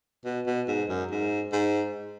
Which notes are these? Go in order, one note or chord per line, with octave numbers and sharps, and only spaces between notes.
B2
B2
G#2
F#2
G#2
G#2